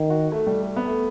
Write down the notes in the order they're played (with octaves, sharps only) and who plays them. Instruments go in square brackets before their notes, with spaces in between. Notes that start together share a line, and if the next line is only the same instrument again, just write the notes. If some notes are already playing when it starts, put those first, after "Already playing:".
Already playing: [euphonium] D#3
[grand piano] F#4
A3
G3
A3
B3
A3